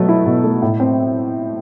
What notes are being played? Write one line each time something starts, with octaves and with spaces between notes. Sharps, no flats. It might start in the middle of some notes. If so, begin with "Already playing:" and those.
Already playing: B2 F#3 A3
E4
B2
A3
A2
C4